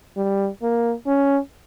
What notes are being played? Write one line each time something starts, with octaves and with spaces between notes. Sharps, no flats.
G3
A#3
C#4